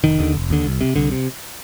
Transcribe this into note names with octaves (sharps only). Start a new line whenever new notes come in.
F1 D#3
D#2 D3
F1
D#2 D3
C2
C3
C2 D3
C3